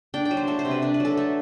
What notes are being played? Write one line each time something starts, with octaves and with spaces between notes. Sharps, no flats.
D4 G5
G5
F#3
C5
A3 A4
C5
C3
B4
D4 B4
B4
F#3 A4
A3